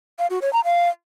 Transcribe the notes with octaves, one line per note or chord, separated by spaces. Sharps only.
F5
F#4
C#5
A#5
F5